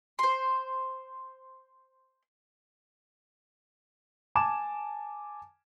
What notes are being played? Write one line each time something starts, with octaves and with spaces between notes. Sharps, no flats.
C5 C6
G#5 A5 D6 E7